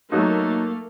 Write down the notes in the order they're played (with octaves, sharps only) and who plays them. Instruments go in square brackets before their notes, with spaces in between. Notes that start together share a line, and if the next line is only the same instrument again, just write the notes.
[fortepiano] F#3 D#4 [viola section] A3 A#3